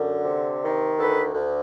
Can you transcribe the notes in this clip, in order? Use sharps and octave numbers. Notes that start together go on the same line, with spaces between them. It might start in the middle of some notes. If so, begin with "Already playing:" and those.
Already playing: F#2 D3
C3
D#3
D2 A4 B4
D2